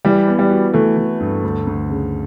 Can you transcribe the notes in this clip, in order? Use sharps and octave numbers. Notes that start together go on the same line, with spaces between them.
E3 G3
B3
G3
F#4
E3 A3
E3
G2
D2
D2
C#3